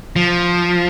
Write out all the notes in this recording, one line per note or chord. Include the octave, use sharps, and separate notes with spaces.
F3